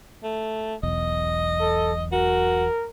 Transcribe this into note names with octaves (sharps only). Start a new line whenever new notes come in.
A3
E1 B1 E2 D#5
A4
F#4 A#4